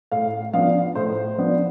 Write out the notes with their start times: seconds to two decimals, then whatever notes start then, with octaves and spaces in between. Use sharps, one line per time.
0.12 A2 F5
0.53 F3 B3 D4 F5
0.95 A2 C5
1.38 F3 B3 D4